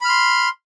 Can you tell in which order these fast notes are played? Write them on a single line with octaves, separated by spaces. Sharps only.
B5 F6 C6